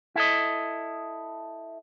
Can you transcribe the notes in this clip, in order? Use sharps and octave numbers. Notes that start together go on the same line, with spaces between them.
E4 A4 D#5